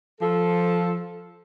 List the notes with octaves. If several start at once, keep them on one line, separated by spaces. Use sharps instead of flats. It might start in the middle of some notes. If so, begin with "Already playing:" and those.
F3 A4